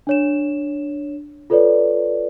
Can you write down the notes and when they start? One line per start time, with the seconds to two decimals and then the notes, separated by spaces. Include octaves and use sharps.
0.07 D4 C#5 E7
1.50 F4 A4 B4 C#5 D5